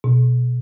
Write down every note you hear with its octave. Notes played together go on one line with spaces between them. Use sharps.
B2